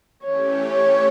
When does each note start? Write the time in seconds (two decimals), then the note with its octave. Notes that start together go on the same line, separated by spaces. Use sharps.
0.23 E3 A3 C#4 G4 C#5
0.71 C#5